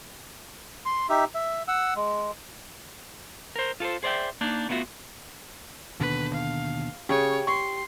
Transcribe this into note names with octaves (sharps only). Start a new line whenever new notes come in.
C6
D#4 G4 E5
E5
F#5 E6
G#3
A#4 C5
F4 A4 B4 C5
G#4 C5 D5 E5 G5
A#3 D4 D#4
A3 B3 D4 F4 F#4 E5
D#2 B2 D3 B4
F5
C#3 G4 C#5
C6 C#6